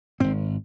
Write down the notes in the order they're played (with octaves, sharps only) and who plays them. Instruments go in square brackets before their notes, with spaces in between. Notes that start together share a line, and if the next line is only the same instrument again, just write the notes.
[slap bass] G#1 G#2 C4